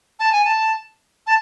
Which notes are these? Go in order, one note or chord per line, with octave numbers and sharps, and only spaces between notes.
A5
G#5
A5
A5